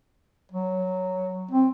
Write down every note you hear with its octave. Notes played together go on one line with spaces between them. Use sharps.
F#3
C4